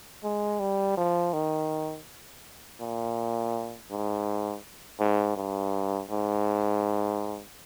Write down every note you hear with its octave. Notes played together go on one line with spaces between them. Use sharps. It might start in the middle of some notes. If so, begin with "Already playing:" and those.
G#3
G3
F3
D#3
A#2
G#2
G#2
G2
G#2